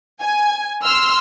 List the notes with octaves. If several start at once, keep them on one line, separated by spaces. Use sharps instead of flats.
G#5
C6 E6 F6